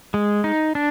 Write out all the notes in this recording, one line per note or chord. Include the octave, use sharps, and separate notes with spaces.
G#3
D#4
D4